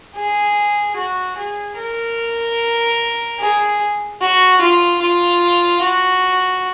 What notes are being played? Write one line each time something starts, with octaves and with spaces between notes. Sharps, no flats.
G#4
F#4
G#4
A#4
G#4
F#4
F4
F4
F#4